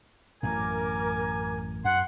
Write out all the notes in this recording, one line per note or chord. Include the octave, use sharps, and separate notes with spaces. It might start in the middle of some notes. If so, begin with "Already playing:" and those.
A1 F#2 A2 A#4 G#5 A#5 D6
F#2 F#5 C6